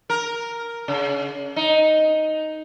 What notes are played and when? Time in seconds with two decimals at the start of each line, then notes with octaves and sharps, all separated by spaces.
0.10 A#4
0.88 C#3
1.56 D#4